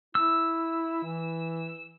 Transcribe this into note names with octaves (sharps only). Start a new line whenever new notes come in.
E4 E6
E3